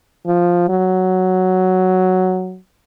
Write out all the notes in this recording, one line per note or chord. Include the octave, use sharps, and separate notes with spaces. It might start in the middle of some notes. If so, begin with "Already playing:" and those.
F3
F#3